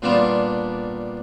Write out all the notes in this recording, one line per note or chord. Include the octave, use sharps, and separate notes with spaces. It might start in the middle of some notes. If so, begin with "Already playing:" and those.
A#2 G3 B3 D4 F4